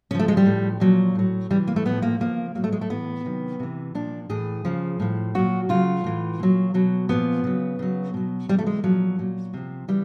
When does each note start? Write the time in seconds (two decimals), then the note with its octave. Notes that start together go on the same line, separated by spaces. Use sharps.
0.11 C#3 C#4
0.14 F3 A3
0.28 G#3
0.37 G3
0.45 A2 F3
0.80 A#2 F3 F#3
1.15 A2 F#3
1.50 C3 E3 G3
1.67 A#3
1.76 A3
1.85 A2 F3 B3
2.02 A#3
2.20 C#3 F3 A#3
2.55 A2 F#3 A#3
2.64 A3
2.72 G#3
2.81 A3
2.90 A2 E3 B3
3.25 C3 D#3 F#3
3.60 C3 E3
3.95 A#2 F3 D4
4.29 A2 E3 G#4
4.65 C#3 F3
5.00 A2 F3
5.35 A#2 F#3 F#4
5.69 C#3 F#3 F4
6.04 A2 E3
6.40 A#2 F#3
6.74 B2 F#3
7.09 A#2 F3 B3
7.44 C#3 F#3
7.79 C#3 F#3
8.14 B2 F#3
8.49 C3 E3 G3
8.59 A3
8.67 G#3
8.84 A#2 F3 F#3
9.19 A#2 F#3
9.54 C3 F3
9.88 C#3 E3 G3